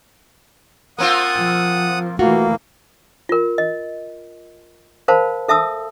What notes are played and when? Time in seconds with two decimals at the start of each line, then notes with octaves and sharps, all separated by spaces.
0.99 A#3 C4 F4 F#5 D#6
1.37 F3
2.19 E3 A3 A#3 F4 F#4
3.29 F4 A#4
3.58 D#5
5.08 A#4 C5 F5 A5 B5
5.48 A4 E5 A5 D#6 E6